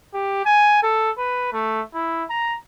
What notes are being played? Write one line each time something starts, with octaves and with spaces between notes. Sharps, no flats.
G4
G#5
A4
B4
A3
E4
A#5